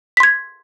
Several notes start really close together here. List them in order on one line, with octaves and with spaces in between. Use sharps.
B6 C6 G#6